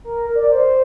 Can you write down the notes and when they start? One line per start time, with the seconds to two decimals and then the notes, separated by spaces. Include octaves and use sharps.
0.04 A#4
0.35 D5
0.51 C5